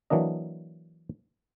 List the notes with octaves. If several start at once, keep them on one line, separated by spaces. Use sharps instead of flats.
E3 F#3 A#3 D4 D#5